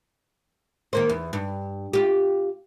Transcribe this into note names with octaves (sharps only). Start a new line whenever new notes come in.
D#3 A#3 C5
E2
G2
F4 G4